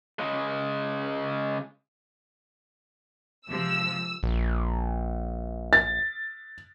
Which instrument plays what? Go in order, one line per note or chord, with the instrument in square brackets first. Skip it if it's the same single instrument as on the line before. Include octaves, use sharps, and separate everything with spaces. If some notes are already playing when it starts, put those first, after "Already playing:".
[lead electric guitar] C#3 G#3
[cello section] C3 F3 G#3 [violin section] E6
[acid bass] A#1
[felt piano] A6